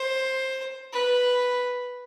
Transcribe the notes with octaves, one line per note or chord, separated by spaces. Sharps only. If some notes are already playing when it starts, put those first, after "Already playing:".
Already playing: C5
B4